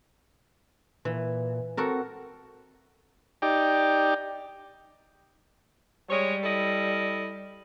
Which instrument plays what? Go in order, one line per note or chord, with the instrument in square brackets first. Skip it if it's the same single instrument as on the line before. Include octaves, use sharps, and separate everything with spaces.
[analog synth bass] A#2 [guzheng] E3
[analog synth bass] C4 [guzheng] F#4 A4 A#4
[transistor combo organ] D#4 G4 D5 G5
[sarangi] G3 [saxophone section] G#3 C#5
[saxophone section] E4 A4 D#5